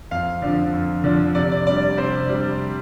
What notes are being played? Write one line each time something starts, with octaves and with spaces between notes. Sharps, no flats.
F2 F5
D3 F3 D4
F2
D3 F3 D4
C3 D5
D5
G3 D4 D5
D5
C3 C5
G3 D4